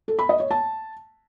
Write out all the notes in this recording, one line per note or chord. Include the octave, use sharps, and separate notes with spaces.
A4
B5
D#5
C#5
A5